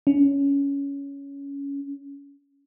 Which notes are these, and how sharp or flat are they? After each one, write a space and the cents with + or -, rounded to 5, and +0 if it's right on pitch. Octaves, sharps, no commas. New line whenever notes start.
C#4 +15